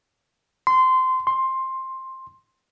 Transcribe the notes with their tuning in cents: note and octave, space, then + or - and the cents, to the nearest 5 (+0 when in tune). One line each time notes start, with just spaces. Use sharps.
C6 -20
C6 +10